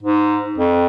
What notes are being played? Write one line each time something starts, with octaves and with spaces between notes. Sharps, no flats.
G#2
F2